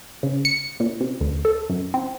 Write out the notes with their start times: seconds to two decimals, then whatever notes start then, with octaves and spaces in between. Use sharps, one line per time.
0.23 C#3
0.45 C#7
0.80 A#2
1.01 C3
1.21 D2
1.45 A4
1.70 F#2
1.94 C4